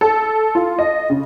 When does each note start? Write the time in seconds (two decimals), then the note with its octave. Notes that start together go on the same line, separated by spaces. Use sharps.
0.01 A4
0.55 F4
0.79 D#5
1.10 C#3